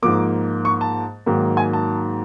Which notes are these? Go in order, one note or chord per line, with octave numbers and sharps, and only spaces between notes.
G#2 F3 A#3 D6
C#6
A5
G#2 D#3 F#3 A#3
G#5
A5